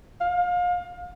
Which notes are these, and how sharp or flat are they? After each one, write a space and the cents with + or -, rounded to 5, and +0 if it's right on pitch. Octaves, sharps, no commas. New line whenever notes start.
F5 +30